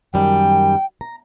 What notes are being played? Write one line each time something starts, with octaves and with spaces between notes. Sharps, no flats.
F#2 D#3 G3 G5
A#5